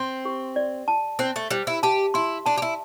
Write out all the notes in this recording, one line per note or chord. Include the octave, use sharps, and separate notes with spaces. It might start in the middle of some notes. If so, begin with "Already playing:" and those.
Already playing: C4 C6
G4
D5
A5
C4 C5
A3
G3 C5
E4
G4 A5
E4 C6
D4 A5
G4
E4